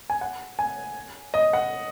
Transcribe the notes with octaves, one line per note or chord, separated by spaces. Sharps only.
G#5
F#5
G#5
D#5
F#5